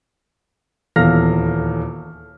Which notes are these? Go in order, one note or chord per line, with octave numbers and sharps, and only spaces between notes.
D#1 E2 A4 F5 F6 A#6